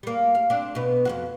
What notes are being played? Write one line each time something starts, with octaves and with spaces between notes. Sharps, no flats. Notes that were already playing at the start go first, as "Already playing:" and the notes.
G3 A#3
F5
C4 D4
B2 B3
F2 F3 F#4